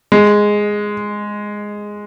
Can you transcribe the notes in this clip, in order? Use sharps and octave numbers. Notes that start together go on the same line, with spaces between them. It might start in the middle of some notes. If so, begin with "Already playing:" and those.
G#3